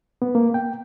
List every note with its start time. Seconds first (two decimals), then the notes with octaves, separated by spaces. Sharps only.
0.22 B3
0.35 A#3
0.54 G5